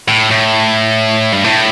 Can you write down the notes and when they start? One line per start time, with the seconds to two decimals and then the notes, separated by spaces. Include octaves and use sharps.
0.08 A2
0.31 A2
1.33 G2
1.44 A2